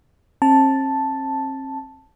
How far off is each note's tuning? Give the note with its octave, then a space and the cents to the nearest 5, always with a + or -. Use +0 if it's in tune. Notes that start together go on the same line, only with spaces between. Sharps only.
C4 +45 A5 +0